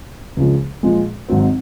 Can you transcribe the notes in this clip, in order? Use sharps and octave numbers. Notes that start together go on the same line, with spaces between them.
C#2 C#3 F3 G#3
A#2 F3 G#3
G#1 G#2 F#3 C4